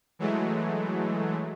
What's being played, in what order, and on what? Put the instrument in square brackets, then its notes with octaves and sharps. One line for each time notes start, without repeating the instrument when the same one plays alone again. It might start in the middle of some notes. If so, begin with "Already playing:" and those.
[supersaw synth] E3 F#3 G#3 A3